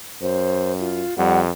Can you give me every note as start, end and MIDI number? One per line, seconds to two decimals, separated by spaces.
0.22 1.04 42
0.22 0.73 72
0.79 1.14 65
1.18 1.50 41
1.18 1.42 55
1.18 1.39 78